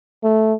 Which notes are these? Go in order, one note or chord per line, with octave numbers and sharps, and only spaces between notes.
A3